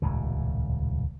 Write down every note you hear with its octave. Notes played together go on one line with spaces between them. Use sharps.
D#1 C#2 A2 C#3